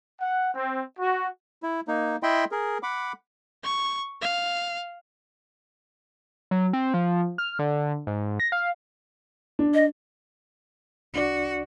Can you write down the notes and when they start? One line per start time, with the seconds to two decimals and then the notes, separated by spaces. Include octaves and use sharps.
0.20 F#5
0.54 C4
0.98 F#4
1.63 E4
1.88 A#3 D#4
2.23 E4 D#5 E5 G5 B5 C6
2.52 G#4 A#4
2.83 F#5 B5 D6
3.64 C#6
4.22 F5
6.51 F#3
6.73 C4
6.94 F3
7.38 F6
7.59 D3
8.07 G#2
8.40 A#6
8.52 F5
9.59 D4
9.74 D#5
11.14 C2 D4 F#4 D5